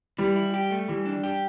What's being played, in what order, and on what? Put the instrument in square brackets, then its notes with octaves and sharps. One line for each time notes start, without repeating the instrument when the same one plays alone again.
[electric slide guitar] E3 [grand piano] G3
[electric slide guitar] E4
G4
A3
[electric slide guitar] E3 [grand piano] G3
[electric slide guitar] D4
G4